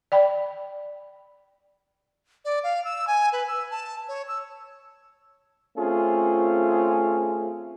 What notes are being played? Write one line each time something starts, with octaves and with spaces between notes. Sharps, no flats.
D5 G5 B5
D5
F5
E6
G#5
B4
E6
A5
C#5
E6
A3 C4 C#4 F4 G#4